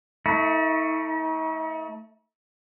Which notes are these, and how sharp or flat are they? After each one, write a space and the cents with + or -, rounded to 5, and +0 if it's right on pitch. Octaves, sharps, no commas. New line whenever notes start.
A3 +15 D#4 +45